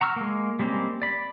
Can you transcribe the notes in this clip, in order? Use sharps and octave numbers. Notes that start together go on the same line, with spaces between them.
F#5 A#5 C#6 E6 F6
G#3 A#3
G3 G#3 A#3 C4 C#4
D5 B5